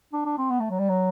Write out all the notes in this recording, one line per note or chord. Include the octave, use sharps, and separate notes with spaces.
D4
D4
C4
B3
A3
F#3
G3
F#3